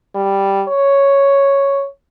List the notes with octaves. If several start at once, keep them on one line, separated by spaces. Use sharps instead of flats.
G3
C#5